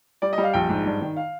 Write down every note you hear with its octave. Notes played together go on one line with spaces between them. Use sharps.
G3 D5
D#5
G3
F5
A#1 G5
G#2
G2
D#3
F5